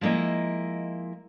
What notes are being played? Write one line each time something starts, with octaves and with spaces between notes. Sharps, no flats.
F3 G#3 A#3 E4 D#5